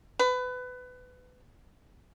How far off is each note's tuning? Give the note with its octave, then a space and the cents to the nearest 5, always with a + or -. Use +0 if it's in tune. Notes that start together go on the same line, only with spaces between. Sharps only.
B4 +25